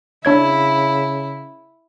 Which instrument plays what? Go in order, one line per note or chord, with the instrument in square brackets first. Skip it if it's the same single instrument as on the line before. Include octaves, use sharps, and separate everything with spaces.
[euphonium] C#3 [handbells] D4 C#5 G#6 [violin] E4